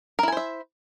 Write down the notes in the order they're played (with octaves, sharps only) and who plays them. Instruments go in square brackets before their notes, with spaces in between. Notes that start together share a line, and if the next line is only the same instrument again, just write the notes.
[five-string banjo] A#4
E4
G#5
C5
E5